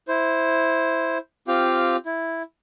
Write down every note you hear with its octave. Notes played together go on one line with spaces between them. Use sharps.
E4 C5
C4 F4 G4 F5 G5
E4